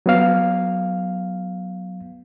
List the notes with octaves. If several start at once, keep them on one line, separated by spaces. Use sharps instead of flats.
F#3 B3 F5